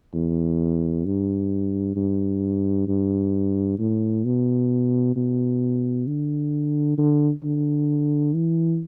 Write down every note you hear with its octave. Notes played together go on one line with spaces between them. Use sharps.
E2
G2
G2
G2
A2
B2
B2
D3
D3
D3
E3